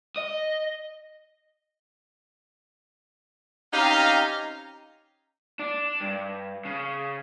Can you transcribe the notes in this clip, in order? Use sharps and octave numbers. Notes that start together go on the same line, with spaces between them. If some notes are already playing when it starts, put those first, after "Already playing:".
D#5
C4 C#4 D#4 G4 F5 A#5
D4
G2
C#3